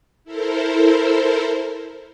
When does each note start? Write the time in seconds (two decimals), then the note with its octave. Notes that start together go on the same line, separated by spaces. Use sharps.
0.24 E4 A4 A#4 C5